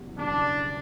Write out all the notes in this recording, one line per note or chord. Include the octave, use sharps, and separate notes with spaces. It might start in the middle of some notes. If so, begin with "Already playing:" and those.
Already playing: F#1 E2 B2 G3
F#1 E2 B2 G3 D4